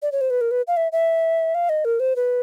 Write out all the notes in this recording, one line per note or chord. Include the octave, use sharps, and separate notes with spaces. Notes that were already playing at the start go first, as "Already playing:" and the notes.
D5
C#5
C5
B4
A#4
B4
F5
E5
E5
F5
D#5
A#4
C5
B4